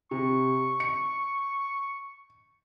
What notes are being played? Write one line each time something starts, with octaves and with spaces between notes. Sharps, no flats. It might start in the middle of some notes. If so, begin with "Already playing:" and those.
C3 C#6
C#7